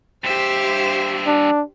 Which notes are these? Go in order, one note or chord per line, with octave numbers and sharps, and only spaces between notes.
G2 G4 C5 E5
D4